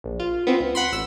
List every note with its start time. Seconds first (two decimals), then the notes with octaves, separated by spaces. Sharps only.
0.04 A#1
0.20 F4
0.47 B3 C4 F4
0.60 C#2
0.75 F#5 B5 C6
0.93 A1 E6